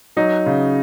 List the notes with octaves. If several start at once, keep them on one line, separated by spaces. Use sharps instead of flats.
F#3 D#4
C#3